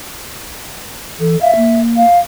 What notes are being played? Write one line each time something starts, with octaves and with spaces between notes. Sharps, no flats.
E3 A4
E5 F5
A#3
F5